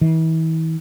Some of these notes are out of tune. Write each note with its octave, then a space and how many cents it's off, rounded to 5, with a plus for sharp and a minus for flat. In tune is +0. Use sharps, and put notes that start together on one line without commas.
E3 -40